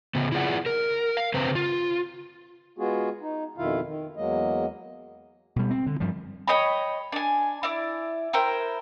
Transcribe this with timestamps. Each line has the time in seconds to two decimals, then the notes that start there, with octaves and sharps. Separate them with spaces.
0.15 C#3 B3
0.32 E4 F4 G#4 D5 F#5
0.66 A#4
1.17 F5
1.34 C#3 C4 B4 C5 A#5
1.55 F4
2.78 G#3 B3 F4 F#4 G#4
3.21 D#4
3.58 F2 B2 D#3 E4 F4 F5
3.86 D#3
4.17 E2 F#3 G#3 A#3 D#5
5.56 B2 G3
5.71 C4
5.86 D3
6.00 G2 F3 G3
6.48 C#5 D#5 G5 B5
7.12 D4 G#5
7.63 E4 D5
8.33 E4 A#4 C5 G5